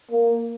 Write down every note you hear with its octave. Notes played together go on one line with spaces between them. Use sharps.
A#3